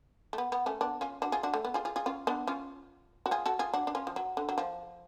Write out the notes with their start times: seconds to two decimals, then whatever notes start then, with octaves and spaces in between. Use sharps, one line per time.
0.33 A3
0.38 B3
0.52 B3
0.66 A3 C#4
0.81 B3 D4
1.01 C#4 F4
1.22 D4 F#4
1.32 F4 G#4
1.43 D4 F#4
1.54 A3
1.65 B3
1.74 F4 G#4
1.85 F4 G#4
1.96 F4 G#4
2.06 C#4 F4
2.27 B3 D4
2.47 C#4 F4
3.26 F#4
3.31 F4 G#4
3.46 F#4 A4
3.59 F4 G#4
3.74 D4 F#4
3.87 D4
3.95 C#4 F4
4.07 F3
4.16 F#3
4.37 D3
4.49 F#3
4.58 F3